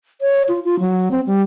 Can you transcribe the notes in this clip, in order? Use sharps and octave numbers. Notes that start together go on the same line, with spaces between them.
C#5
F4
F4
F#3
C4
G3